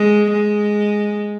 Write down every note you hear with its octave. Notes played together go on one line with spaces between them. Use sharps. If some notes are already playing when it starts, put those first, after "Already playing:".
Already playing: G#3
G#3